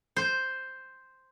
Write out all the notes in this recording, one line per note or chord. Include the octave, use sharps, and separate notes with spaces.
C5